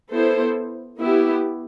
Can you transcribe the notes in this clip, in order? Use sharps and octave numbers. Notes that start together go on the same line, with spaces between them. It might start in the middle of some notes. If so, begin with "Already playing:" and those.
B3 E4 A4 C5
B3 E4 G4